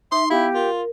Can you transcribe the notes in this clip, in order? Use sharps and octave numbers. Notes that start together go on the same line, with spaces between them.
D#4 E5 C6
B3 E4 G4 F5
F4 A#4